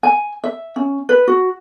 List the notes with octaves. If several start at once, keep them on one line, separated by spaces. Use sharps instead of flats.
G#5
E5
C#4
B4
F#4